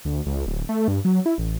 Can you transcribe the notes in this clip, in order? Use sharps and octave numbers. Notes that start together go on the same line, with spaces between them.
D2
C#2
D1
A3
G2
F#3
E4
A1